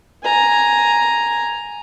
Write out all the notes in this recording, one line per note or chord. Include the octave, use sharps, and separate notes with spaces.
G#5 A#5